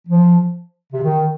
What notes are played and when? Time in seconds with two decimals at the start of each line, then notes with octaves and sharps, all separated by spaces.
0.08 F3
0.93 C3
1.03 D#3